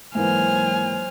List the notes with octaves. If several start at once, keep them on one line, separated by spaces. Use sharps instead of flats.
G#2 E3 F#3 A#3 C5 G#5 F6